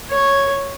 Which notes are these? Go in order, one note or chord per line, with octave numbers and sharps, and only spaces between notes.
C#5